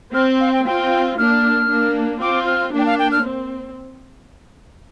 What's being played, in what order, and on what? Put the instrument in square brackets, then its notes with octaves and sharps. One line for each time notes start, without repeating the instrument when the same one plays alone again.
[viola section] C4 [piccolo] F6
[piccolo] F5
G5
[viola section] C4 F4 [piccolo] G5
[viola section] A#3 D4 [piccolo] F6
[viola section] A#3 D4
[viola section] C4 F4 [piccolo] D6
[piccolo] F6
[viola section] A#3 D4
[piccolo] G5
F5
G5
F6
[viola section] C4